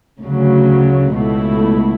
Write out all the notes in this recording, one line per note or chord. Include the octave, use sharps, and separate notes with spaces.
D2 C#3 F#3
C#2 B2 A3 E4